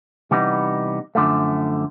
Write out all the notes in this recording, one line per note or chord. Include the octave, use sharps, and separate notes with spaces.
C3 E3 G3 B3 D#4
F#2 D3 F3 A3